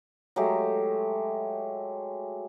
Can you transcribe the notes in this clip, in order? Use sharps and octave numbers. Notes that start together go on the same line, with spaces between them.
F#3 G#3 A3 G4